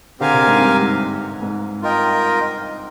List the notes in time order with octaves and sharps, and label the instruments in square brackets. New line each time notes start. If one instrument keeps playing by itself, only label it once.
[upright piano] D3 [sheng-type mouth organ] C4 G4 A#4 F5 G#5
[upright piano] C3
G#2
G2
G#2
G#2
[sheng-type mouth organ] F4 A#4 D#5 G5